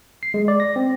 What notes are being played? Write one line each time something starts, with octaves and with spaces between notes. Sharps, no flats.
C7
G#3
D5
A#6
C4